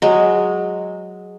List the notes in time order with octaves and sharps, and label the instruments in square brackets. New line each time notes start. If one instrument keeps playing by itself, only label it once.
[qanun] F#3 G#3